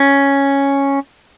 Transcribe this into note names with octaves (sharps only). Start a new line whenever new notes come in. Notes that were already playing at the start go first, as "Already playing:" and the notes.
Already playing: C#4